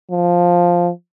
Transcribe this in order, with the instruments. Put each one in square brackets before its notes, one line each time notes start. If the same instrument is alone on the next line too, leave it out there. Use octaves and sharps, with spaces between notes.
[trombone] F3